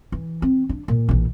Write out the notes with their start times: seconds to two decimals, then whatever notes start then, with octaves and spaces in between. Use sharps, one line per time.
0.12 E3
0.42 C4
0.69 D4
0.88 A#2
1.09 A#1 E3